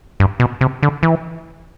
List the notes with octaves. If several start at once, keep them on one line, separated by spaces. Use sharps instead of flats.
G2
B2
C3
D3
E3